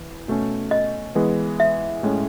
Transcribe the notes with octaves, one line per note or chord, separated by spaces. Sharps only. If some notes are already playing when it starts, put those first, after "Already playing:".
Already playing: E3
B2 A3 C#4
D#5
E3 G#3 B3
E5
A2 G#3 C#4